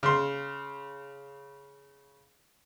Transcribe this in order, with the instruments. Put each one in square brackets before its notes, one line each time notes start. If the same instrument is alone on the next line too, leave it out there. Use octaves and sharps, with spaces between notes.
[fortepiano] C#3 C6